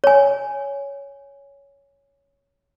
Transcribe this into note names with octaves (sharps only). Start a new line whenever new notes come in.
C#5 G#5